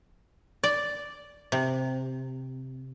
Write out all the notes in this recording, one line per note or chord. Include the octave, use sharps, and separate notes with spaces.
D5
C3